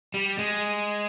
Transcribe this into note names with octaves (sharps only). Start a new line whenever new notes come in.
G3
G#3